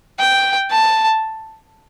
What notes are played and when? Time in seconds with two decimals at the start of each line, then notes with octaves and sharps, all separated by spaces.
0.19 G5
0.70 A5